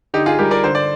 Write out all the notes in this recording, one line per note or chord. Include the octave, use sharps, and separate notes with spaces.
D3 D#4 G4
F4 G#4
G3 G4 A#4
A#4 D5
D3 C5
D5